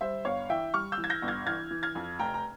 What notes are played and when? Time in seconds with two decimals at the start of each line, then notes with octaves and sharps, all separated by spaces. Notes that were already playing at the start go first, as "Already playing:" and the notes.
0.01 G3 C5 E5
0.25 G1 C#5 F5
0.50 E3 E5 G5
0.74 G3 C#6 F6
0.92 E6 G6
0.98 E3
1.04 G#6
1.10 G6 A#6
1.22 G1
1.28 F6 G#6
1.46 E3 F6 G#6
1.71 E3
1.83 F6 G#6
1.95 F2
2.19 F1 G5 A#5
2.34 A#5